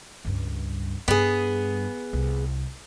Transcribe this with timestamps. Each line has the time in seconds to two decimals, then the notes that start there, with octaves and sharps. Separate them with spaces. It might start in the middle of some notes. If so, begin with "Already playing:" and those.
0.25 C#2 G2
1.08 G2 B3 G#4
2.13 C2